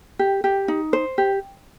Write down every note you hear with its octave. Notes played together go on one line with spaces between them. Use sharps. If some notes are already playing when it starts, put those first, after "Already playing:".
G4
G4
D#4
C5
G4